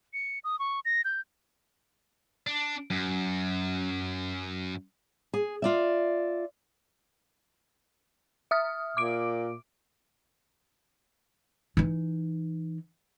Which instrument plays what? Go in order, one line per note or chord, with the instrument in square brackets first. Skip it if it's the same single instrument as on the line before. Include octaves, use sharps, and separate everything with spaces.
[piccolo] C#7
D#6
C#6
A#6
G6
[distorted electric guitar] D4
F#2
[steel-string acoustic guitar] G#4
F4 D5 E5
[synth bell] E5 D#6 F6
[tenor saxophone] A#2 [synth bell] D6 D7
[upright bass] E3 D#4